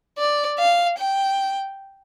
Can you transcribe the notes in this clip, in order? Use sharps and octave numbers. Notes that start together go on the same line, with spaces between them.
D5
F5
G5